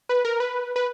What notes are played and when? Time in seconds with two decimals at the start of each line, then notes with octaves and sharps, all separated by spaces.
0.09 B4
0.25 A#4
0.40 B4
0.76 B4